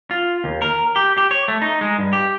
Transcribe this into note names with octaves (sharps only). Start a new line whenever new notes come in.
F4
D#2
A#4
G4
G4
C#5
A3
D#4
G#3
G2
G4